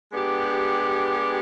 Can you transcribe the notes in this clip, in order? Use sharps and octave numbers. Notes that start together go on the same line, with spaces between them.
G#3 B3 D4 G4